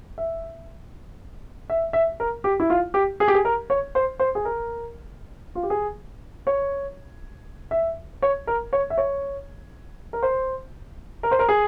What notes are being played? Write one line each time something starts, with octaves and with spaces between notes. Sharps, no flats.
E5
E5
E5
A#4
G4
E4
F4
G4
G#4
G4
G#4
A#4
C#5
C5
C5
G#4
A#4
F4
G4
G#4
C#5
E5
C#5
A#4
C#5
E5
C#5
A#4
C5
A#4
C5
A#4
G#4